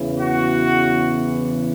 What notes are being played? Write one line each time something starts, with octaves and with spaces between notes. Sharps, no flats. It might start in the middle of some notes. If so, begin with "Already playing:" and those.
Already playing: E2 C#3 E3
F#4